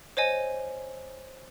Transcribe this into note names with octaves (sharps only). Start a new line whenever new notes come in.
C5 C#5 D#5 G#5